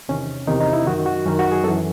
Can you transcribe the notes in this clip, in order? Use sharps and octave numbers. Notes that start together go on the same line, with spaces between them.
E2 C3 D#3 C#4
E2 C3 D#3 D#4
D#4
E4
F#2 D#3 F#4
F#4
F#2 D#3 C#4
F#4
G#4
F#2 E3 A4